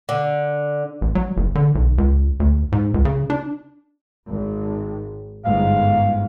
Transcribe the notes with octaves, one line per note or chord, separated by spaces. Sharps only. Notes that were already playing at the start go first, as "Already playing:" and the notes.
D3
A1
F#3
F#1
D3
B1
C#2
D2
G#2
C#2
C#3
D4
G#1
G1 G#2 F5